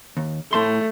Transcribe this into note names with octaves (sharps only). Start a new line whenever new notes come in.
D#2
A2 A3 A5 C6